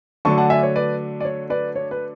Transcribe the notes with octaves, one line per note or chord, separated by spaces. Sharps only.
D3 F#3 A3 D4 A5 C#6
F#5 A5
E5 G#5
C#5
B4 D5
D5
C#5
B4 D5
C#5
B4